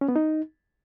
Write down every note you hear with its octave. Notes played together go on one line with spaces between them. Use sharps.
C#4
B3
D#4